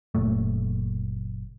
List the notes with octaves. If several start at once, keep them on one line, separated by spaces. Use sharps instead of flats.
F#1 A#2 A3